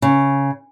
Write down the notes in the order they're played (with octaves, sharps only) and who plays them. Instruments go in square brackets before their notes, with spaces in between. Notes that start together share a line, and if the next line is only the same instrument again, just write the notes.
[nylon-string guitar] C#3